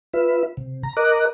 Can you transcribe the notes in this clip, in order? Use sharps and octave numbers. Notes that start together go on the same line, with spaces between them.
F4 B4 E5
C3
A#5
A#4 D#5 A#5 D6 F#6